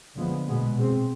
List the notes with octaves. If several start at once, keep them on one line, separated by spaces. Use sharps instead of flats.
D3 F3 G#3 B3
B2 G#3 B3
B2 G#3 C4